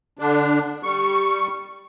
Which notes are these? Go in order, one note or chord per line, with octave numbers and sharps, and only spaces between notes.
D3 D4
G3 C#6